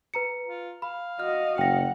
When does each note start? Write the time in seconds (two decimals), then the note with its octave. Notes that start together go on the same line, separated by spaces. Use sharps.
0.14 B4 A#5 C#7
0.45 F4
0.82 F5 B5
1.20 F#4 D#5 F6
1.58 F#1 F#5 G5 A#6